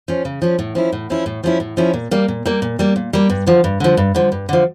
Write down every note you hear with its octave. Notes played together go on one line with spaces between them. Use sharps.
F3 C#4
C#3
F3 C#4
A2
F3 C#4 E4
A2
F3 C#4 E4
A2
F3 C#4 E4
A2
F3 C#4 E4
A#2
G3 A#3
A#2
G3 A#3
A#2
G3 A#3
A#2
G3 A#3
G2
D3 F3
G2
D3 F3
G2
D3 F3
G2
D3 F3